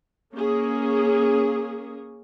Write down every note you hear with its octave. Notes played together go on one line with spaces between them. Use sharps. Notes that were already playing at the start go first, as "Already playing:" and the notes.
A#3 C#4 G#4